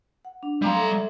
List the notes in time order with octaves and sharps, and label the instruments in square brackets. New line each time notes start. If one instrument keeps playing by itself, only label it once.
[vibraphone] F#5
D4
[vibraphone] F#3 F5 C6 [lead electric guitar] G3 A#5
[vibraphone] A4 E5